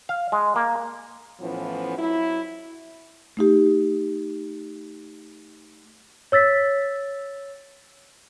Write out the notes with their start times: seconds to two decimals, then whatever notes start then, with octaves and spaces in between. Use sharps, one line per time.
0.09 F5
0.32 G#3
0.56 A#3
1.41 A2 E3 F3 B3 C#4
1.98 F2 F#3 E4
3.37 A3 D#4 G4
6.32 C#5 E6 A6 B6